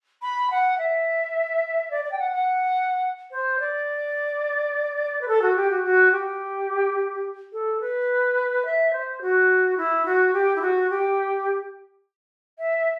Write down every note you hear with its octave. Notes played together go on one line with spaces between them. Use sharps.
B5
F#5
E5
D5
D5
G5
F#5
F#5
C5
D5
B4
A4
F#4
G4
F#4
F#4
G4
A4
B4
E5
C5
F#4
E4
F#4
G4
E4
F#4
G4
E5